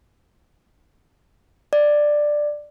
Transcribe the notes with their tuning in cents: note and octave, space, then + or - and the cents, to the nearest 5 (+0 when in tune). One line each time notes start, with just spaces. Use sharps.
D5 +10